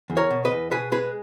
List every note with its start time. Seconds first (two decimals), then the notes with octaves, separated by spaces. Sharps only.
0.10 E2
0.17 A#4 C#5
0.30 B2
0.45 B4 D#5
0.51 E2
0.71 B2 G#4 B4
0.92 G#3 G#4 B4